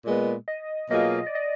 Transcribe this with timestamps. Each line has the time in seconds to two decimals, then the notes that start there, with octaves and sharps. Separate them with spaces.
0.05 A#2 G#3 B3
0.48 D#5
0.90 B2 F#3 A#3 F4 G#4 D#5
1.19 D#5
1.26 D5
1.35 D#5